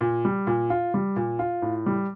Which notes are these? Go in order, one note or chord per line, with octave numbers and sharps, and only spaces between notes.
A#2
G3
A#2
F4
G3
A#2
F4
A2
G3